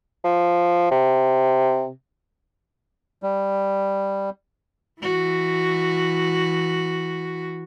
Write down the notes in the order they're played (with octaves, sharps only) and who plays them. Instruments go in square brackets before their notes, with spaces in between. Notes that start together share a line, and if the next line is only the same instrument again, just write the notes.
[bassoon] F3
C3
[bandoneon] G3
[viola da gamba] E3 F#4